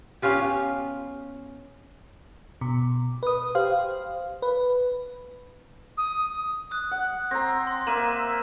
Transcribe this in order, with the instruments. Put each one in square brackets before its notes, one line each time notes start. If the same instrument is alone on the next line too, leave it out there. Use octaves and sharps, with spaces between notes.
[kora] B3 C#4 F4 G4
[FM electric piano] B2
B4 D#6
G4 C5 F5
B4
[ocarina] D#6
[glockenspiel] D#6 F#6
[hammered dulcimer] F#5
[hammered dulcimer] C4 A#5 [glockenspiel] A#6
[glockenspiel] C6
[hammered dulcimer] A#3 E5 [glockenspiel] D#7 E7 F#7